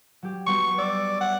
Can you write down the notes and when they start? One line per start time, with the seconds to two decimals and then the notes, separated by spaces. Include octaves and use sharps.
0.22 F#3 G4
0.47 G3 B3 F#4 C#6
0.79 D5 E6
1.21 C#5 F#5